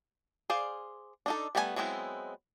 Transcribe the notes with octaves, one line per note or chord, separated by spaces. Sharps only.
G#4 C5 D5 F5
D4 D#4 A4
G3 A3 B3 D#4 G#5
F#3 G#3 B3 C4 E4